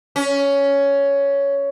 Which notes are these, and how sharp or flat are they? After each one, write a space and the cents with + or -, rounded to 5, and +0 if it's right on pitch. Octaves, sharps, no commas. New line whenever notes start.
C#4 +10